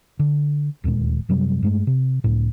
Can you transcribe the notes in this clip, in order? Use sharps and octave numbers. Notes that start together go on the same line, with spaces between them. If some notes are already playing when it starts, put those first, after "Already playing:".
D3
D1 D#2 A#2 G#3
F#2 C3 F#3 G3
G2 G#3 A3
C3
C#2 A2